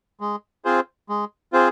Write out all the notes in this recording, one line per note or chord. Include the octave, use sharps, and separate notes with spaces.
G#3
C4 F4 G#4 C5
G#3
C4 F4 G#4 C5